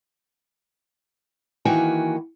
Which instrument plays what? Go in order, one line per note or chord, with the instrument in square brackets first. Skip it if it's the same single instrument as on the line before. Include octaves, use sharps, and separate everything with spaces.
[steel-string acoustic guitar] D#3 E3 A#3 F#4 G5 G#5